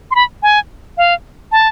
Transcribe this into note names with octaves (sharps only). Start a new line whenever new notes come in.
C6
B5
G#5
F5
A5